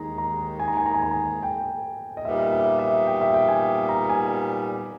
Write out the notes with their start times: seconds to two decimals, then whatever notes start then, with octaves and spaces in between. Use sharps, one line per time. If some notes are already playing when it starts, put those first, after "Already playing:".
Already playing: D#2 D#3 G#3 D#4 A#5
0.18 A#5
0.59 G#5
0.68 A#5
0.77 G#5
0.86 A#5
0.94 G#5
1.03 A#5
1.11 G#5
1.43 G5
2.17 D#5
2.24 A#2 G3 B3 D#4 E5
2.51 E5
2.79 E5
3.07 G5
3.21 E5
3.34 G5
3.48 G#5
3.89 A#5
4.09 G#5